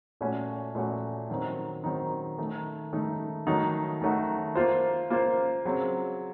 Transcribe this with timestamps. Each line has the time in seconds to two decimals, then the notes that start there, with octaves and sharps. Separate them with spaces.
0.21 A#2 A3 C#4 F#4
0.75 A#2 A3 C#4 F#4
1.29 D#3 F#3 C4 D#4
1.84 D#3 F#3 C4 D#4
2.38 D#3 A3 D#4
2.93 D#3 A3 D#4
3.47 D#3 F#3 A3 D#4 F#4
4.01 D#3 F#3 A3 D#4 F#4
4.55 A#3 F4 C5
5.10 A#3 F4 C5
5.65 C#3 F#3 C4